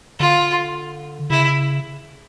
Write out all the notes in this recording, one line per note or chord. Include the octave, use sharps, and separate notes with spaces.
D3 F4
C#3 E4